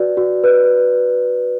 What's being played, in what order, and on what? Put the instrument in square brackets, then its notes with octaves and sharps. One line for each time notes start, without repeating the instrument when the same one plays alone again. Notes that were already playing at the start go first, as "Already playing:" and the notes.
Already playing: [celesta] F#4 B4 D5
F#4
B4